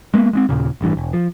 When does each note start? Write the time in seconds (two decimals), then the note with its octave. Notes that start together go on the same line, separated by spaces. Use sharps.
0.14 G#3 A#3 B3
0.33 G#3 B3 C4
0.49 D#2 A#2 C#3
0.81 A1 G2 E3
0.97 E1
1.13 F3